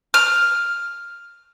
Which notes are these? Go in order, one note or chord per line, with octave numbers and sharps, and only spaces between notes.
F6